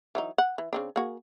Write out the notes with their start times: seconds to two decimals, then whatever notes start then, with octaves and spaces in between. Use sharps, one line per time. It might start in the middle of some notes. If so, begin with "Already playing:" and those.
0.15 E3 F#3 D#4
0.38 F#5
0.58 E3
0.73 C#3 C4 D4
0.96 A#3 F#4 G#4